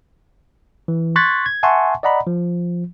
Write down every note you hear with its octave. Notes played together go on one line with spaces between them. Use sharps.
E3
C6 C#6 F#6 G#6 A6 B6
G#6
E5 F#5 G#5 A5 C6 C#6
D5 D#5 F#5 A#5 B5
F3